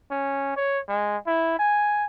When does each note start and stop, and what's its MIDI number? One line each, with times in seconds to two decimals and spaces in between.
0.11 0.53 61
0.57 0.80 73
0.88 1.17 56
1.27 1.59 64
1.59 2.06 80